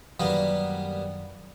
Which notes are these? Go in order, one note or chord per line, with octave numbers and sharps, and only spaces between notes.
F#2 D#3 F#3 G3 A#3 B3